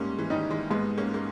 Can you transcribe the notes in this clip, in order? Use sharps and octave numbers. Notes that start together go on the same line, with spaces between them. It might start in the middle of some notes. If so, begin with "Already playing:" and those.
Already playing: G#2 G3 A#3 C#4
E3
D#3 G3 D#4
E3 G#3
G#2 G#3 B3
A#3 C#4
A#3